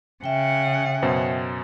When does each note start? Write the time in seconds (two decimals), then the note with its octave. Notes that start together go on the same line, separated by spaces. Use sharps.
0.24 C#3 E5 F#5 G5
1.02 F#2 B2 C5